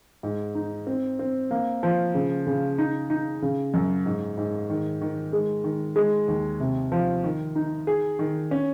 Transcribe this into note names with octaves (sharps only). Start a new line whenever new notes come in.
G#2
D#4
C4
C4
A#3
F3
C#3
C#3
D#4
D#4
C#3
F#2
G#2
G#2
D#3
D#3
G#3
D#3
G#3
D#2
C3
F3
D#3
D#4
G#4
D#3
C#4